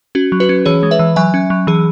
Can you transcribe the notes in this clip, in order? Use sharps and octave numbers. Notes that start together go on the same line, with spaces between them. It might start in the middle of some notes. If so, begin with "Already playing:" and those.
C#4 F#4
F#3
F#4 B4
C#4
E3 G#4 C#5
G#3
B4 E5
E3
F#3 E5 G#5
C#4
F#3
E3 G#4